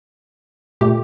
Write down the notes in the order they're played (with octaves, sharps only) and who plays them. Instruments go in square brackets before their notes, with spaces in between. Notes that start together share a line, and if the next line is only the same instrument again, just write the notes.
[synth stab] A#2 A3 G4